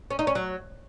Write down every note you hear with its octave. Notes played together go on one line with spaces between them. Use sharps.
C#4
D#4
C#4
F#3